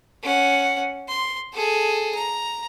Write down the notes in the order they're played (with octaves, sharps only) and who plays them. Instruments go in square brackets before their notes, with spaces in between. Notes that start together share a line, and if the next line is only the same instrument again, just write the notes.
[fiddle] C#4 F#5
C6
G#4 A4
A#5